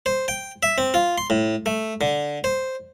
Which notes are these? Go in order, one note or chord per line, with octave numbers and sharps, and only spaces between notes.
C5
G5
E5
C4
F4
C6
A2
A3
D3
C5